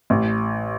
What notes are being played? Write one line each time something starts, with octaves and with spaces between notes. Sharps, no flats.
A1